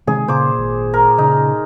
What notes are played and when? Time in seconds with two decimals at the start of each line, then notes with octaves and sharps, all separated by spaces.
0.07 C3 D#3 G#3 G#4
0.28 A#2 C#3 C5 D6
0.58 G#1
0.94 A#4
1.18 C#3 D#4